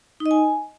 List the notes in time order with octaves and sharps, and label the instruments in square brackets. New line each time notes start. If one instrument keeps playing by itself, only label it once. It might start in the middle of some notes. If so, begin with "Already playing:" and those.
[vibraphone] D#4
D#5
G#5